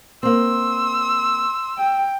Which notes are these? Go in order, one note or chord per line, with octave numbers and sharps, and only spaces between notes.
A#3 C4 C6 E6
G5